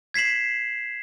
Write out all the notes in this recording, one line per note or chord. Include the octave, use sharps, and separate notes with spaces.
G#6 B6 C7 E7 F#7